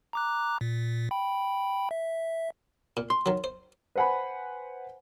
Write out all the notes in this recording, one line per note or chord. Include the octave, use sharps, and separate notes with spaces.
A#5 D6 F#6
A#2
G5 B5
E5
A#2
C6
D#3 F#3
C5
B4 C5 F#5 G#5 B5